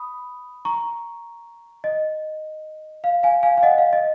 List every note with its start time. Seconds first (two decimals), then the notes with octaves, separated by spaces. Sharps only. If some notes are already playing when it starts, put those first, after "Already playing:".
Already playing: B5 D#6
0.65 A#5 C#6
1.84 D#5
3.04 F5
3.23 F5 G#5
3.43 F5 G#5
3.57 F5
3.63 D#5 F#5
3.78 F5
3.93 D#5